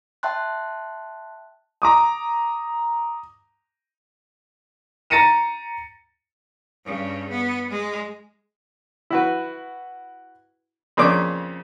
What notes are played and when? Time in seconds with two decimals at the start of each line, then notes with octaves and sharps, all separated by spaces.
0.23 E5 G5 A5 C6 F#6
1.82 A#5 D6 D#6
5.10 A#5 A6 A#6 C#7 D#7 E7
6.85 G2 C#3
7.30 B3
7.70 G#3
9.10 E4 F#4 B4
10.97 F2 C#3 A#3 D4 D6